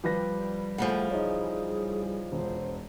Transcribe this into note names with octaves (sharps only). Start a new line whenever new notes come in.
F3 G3 B4 A#6
C#3 E3 F3 A3 F#5
D#4 G#4 C#5
E1 C5